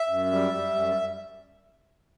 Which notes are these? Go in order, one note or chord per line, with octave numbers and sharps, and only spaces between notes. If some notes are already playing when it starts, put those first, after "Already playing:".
Already playing: E5
F#2
G3
G3
F#2